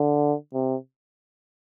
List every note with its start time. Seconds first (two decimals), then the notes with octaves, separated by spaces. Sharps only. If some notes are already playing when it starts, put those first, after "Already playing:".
Already playing: D3
0.54 C3